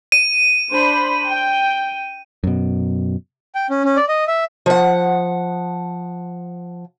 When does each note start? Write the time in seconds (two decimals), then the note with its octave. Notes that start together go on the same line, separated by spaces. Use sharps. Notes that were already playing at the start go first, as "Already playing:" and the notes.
0.12 D#7
0.70 D4 C5 B5
1.29 G5
2.44 F#2 B2
3.55 G5
3.70 C#4
3.84 C#4
3.96 D5
4.09 D#5
4.28 E5
4.66 F3 F#5